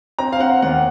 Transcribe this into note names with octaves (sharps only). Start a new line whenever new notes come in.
C4 A#5
F5
C4 F#5
D#2 F#5